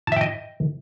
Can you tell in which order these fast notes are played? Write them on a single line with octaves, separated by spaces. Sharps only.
A5 E5 G5 D#5